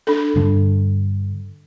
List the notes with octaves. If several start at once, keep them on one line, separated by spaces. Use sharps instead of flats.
D4 A4
G2 D3